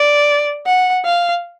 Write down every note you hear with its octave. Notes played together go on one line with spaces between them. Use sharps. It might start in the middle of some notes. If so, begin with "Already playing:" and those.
Already playing: D5
F#5
F5